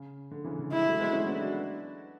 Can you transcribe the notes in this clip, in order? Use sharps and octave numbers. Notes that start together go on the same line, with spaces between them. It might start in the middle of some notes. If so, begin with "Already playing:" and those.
Already playing: C#3
D3
C#3 E3
D3
E3 G#3 E4
F#3 A3
G#3 B3
A3 C#4
B3 D4
D4 F#4